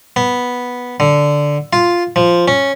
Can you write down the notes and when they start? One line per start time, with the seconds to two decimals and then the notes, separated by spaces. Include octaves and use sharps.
0.16 B3
1.00 D3
1.73 F4
2.16 F3
2.48 C#4